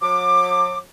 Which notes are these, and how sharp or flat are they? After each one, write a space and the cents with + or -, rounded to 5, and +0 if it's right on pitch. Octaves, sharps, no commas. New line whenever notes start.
F#3 -40 D6 +20